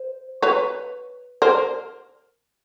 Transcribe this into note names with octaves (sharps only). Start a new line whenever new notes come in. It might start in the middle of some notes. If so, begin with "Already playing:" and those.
Already playing: C5
B4 C#5
A#4 C5